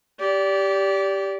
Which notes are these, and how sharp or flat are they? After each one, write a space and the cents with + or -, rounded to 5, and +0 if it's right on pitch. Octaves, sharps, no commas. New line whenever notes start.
G4 +0 D5 -25